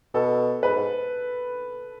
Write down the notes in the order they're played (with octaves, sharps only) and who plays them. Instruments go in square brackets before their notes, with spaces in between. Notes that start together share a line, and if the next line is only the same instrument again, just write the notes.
[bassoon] B2 [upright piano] A4
[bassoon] G#2 [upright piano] B4
[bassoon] G#2